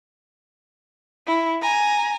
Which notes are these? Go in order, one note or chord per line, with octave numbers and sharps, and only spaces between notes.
E4
G#5 A#5